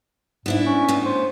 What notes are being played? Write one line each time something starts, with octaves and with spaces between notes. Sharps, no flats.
G#2 B3 D4 E4
C#4
A2 B3
C5